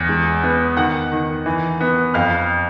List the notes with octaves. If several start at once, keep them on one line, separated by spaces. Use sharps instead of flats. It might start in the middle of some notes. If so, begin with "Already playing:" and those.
Already playing: E2
G#3
B3
D#3 F#5 F#6
D#3
E3
B3
F2 F5 F6